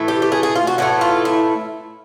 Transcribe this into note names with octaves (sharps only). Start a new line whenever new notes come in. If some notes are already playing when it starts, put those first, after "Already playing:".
Already playing: A2 E3 A3
G4
G4
G#4
G#4
F4
F#4
A2 E3 A3 F#4
F4
E4